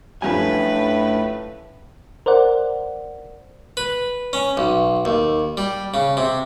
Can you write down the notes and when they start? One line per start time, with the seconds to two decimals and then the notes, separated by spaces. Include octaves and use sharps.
0.22 F#2 A2 F3 G3 A3 D4 B4 G#5
2.26 A#4 C5 D5 F#5
3.77 B4
4.33 C#4
4.57 B1
5.05 D#2
5.57 G3
5.94 C#3
6.17 C3